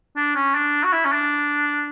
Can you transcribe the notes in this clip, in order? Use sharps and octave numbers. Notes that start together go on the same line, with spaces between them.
D4
C#4
D4
F#4
E4
C#4
D4